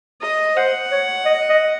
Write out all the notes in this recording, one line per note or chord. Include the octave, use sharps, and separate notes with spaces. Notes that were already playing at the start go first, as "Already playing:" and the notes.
D#5
C5 F#5
C#5
D#5
D#5